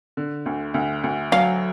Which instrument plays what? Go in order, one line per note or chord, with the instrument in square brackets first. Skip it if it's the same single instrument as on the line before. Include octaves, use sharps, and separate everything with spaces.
[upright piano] D3
D2
D2
D2
[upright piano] F#3 [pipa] F5